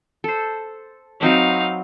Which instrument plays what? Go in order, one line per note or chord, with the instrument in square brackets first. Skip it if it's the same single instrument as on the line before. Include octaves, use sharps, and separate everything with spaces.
[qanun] A4 C5
[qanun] F#3 C4 B4 [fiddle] D#4 F5